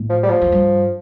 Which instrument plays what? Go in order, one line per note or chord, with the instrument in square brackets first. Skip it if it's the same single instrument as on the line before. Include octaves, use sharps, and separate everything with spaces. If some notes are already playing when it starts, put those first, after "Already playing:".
Already playing: [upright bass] A2
[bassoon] F3
G3
F3
[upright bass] F2
G2